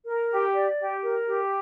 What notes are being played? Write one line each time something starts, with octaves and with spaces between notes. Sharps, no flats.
A#4
G4
D5
G4
A#4
G4